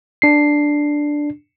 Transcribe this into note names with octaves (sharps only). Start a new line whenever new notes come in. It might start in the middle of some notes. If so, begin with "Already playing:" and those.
D4 C7